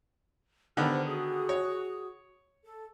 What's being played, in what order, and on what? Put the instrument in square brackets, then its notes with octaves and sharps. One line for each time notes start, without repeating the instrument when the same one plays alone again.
[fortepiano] D3 D#3 B3 [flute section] G4 C5 F6
[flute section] F#4 G#4 D#6
[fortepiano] C#5
[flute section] A4